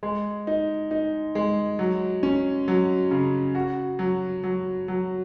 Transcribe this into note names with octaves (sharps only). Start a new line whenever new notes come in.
G#3
D#4
D#4
G#3
F#3
C#4
F#3
C#3
F#4
F#3
F#3
F#3